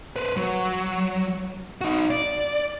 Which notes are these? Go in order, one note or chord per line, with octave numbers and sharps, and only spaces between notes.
B4 C5
F#3
D#4 F#4
D5